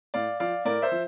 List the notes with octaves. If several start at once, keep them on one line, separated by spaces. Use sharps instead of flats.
A2 D5 F5
F3 D5 F5
A2 A#4 D5
C5 E5
F3